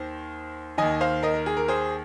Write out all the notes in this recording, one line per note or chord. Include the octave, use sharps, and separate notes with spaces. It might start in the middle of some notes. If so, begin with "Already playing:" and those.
Already playing: D#2 D#3 C5
D#2 D#3 D#5 G#5
C5 F5
A#4 D#5
A#4
G#4
A#4
G#4 C5